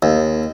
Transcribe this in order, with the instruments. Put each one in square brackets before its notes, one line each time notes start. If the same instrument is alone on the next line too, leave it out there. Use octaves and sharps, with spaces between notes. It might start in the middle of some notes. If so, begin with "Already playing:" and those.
[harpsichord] D#2